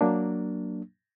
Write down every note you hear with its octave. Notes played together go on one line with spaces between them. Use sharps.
F#3 A#3 D4